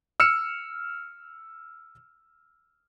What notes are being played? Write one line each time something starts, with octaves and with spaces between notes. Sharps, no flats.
E6 F6 C#7 E7